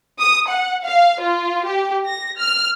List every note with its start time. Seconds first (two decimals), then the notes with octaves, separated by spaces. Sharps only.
0.19 D#6
0.49 F#5
0.85 F5
1.21 F4
1.65 G4
2.07 A#6
2.39 F6